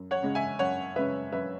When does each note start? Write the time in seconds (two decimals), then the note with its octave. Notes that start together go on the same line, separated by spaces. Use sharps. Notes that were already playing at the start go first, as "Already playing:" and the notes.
Already playing: F#2
0.11 C#5 F#5
0.22 C#3 G#3 C#4
0.35 E5 G#5
0.59 F#2 C#5 F#5
0.96 C#3 G#3 C#4 B4 E5
1.32 F#2 B4 E5